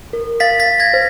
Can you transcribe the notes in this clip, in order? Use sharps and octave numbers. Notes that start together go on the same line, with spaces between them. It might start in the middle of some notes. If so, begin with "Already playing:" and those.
A#4
F5 A6 B6
A6 B6
F5
G#6 A#6
C5